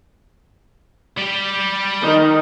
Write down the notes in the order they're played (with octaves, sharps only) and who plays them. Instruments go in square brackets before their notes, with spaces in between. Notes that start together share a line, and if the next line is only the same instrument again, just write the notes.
[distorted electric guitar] G3 G4
[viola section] D#3 D#4